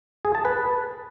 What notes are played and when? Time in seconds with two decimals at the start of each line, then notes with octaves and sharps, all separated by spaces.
0.25 G#4
0.35 A5
0.45 B4